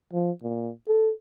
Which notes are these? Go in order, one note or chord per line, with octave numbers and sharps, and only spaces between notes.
F3
A#2
A4